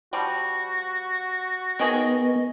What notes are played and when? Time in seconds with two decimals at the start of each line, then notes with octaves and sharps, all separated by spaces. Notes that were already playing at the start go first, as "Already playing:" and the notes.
0.13 F3 G3 F#4
1.79 D#3 B3 G#4 C#5 D#5